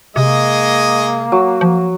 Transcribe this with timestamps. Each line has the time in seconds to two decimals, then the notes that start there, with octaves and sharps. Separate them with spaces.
0.16 C3 G#3 A#3 D#5
1.32 F#3
1.61 F3